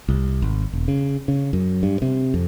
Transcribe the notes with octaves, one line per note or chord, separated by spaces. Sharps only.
C2
G#1
E1
C#3
C#3
F#2
G2
C3
F2